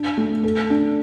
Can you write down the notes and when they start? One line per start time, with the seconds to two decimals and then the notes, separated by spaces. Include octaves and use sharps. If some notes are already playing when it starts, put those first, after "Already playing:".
Already playing: D4
0.17 A3
0.43 A4
0.70 D4